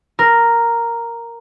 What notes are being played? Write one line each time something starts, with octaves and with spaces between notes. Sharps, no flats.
A#4